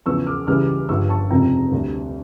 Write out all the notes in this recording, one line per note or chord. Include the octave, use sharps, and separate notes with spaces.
E2 C#3 F3 C#6 E6
D6 F6
C#2 C#3 E3 G3 D6 F6
G1 G2 F3 C#6 E6
A5 C#6
F1 F2 C#3 F3 G5 A#5
D2 D3 G3